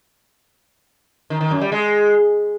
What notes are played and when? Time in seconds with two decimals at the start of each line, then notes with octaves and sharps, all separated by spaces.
1.30 D#3
1.41 D#3
1.51 F#2
1.61 G3
1.72 G#3